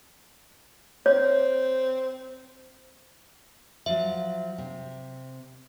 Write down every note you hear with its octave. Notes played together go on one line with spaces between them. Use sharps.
C4 C#5
F3 F#3 E5
C3